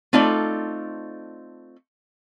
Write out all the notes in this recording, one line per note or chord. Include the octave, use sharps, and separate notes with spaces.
A3 C4 D#4 F4 A4 D5